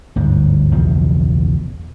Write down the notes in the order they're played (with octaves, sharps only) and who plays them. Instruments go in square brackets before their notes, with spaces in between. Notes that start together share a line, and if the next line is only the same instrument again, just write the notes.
[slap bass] G1 D2 G#2
F#1 B1 E2 F3